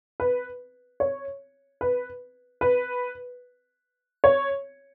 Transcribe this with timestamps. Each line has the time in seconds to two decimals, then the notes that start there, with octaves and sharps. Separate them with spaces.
0.20 B4
1.00 C#5
1.81 B4
2.61 B4
4.24 C#5